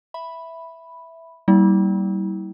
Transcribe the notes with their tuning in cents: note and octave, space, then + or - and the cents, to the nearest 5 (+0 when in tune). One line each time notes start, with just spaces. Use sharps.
E5 +0 B5 +0
G3 -25 A#3 +0 E4 -30